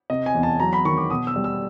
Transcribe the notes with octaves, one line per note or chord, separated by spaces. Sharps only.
C3 D#5
G#5
E2
A5
F#3 A#5
B5
D#3 C#6
D6
B2 D#6
E6
G3
E6